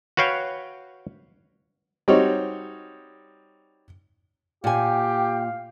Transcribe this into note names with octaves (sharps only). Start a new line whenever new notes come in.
F#4 B4 C#5 F5 G5
G3 C4 D#4 F#4 C#5
A#2 G4 F5 G5 G#5